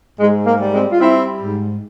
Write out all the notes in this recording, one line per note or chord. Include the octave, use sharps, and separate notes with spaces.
G#2 G#3
A#3
G3
G#3 C4
F4
G3 C4 E4
G#2